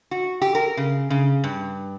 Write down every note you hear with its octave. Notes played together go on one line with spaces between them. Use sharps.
F#4
G4
A#4
C#3
C#3
G2